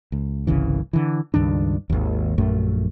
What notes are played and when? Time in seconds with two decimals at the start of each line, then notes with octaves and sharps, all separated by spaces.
0.12 C#2
0.47 G1 C2 C#3 E3
0.93 D3 E3
1.34 C#2 G2 D#3 D4
1.90 G#1 D#2
2.38 A#1 F#2 A3